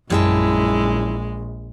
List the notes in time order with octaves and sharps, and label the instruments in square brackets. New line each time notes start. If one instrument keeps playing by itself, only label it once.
[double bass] A#1 [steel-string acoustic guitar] F#2 G5 A5 [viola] G#3 [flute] E4